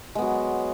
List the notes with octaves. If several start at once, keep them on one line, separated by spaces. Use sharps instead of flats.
F#3 G#3 B3